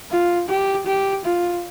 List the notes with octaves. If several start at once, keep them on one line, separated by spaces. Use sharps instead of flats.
F4
G4
G4
F4